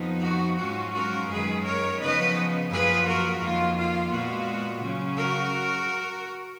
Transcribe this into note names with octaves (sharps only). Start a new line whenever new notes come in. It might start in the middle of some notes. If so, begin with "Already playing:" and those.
Already playing: F2 F3 B3 D#4
F#4
G#2 F#3 C#4 F4 F#4
F#4 A#4
F#2 D#3 G#3 G#4 B4
A#4 C#5
C#3 F3 B3 D#4 B4 D#5
F#2 F3 A#3 F4 G#4 B4
F#4 A#4
F2 D#3 A#3 F4
F4
A#2 G#3 B3 F4 F#4
C#3 F#3 C#4
F#4 A#4